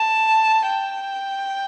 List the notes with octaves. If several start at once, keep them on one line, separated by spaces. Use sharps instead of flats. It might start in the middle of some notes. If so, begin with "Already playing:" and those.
Already playing: A5
G5